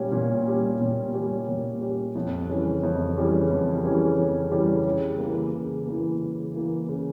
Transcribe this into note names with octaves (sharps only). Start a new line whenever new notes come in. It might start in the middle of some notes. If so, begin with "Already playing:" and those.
Already playing: A#2 G3 C#4 G4
A#2
G3 C#4 G4
A#2
G3 C#4 G4
A#2
G3 C#4 G4
F2
C#3 E3 G3 C#4
F2
C#3 E3 G3 C#4
F2
C#3 E3 G3 C#4
F2
C#3 E3 G3 C#4
C#3
E3 A#3
C#3
E3 A#3
C#3
E3 A#3
C#3